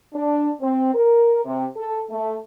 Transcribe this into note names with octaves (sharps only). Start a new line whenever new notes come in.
D4
C4
A#4
C3
A4
A3